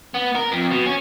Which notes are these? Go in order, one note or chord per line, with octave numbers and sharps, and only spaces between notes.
B3
A#4
F2
B2
C#4